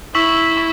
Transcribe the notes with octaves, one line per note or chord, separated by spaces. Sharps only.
E4 C#6 E6 B6 F#7
C#6